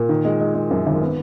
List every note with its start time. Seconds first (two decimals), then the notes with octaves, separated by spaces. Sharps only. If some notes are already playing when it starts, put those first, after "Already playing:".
Already playing: A#2
0.09 D#3
0.25 G#3
0.40 G#3
0.55 G#3
0.71 F#2
0.86 G#1
1.02 B3